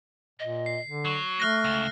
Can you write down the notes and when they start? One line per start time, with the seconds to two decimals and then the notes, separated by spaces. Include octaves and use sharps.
0.40 A#2 D#5
0.66 C7
0.85 D3
1.05 F#3 C#6
1.40 A3 F6 F#6 A#6
1.64 C#2